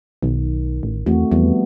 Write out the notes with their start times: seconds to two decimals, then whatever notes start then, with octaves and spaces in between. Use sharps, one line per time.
0.23 B1 D#3
0.83 A1
1.06 E2 A3 C4 F#4
1.31 E2 F3 G3 B3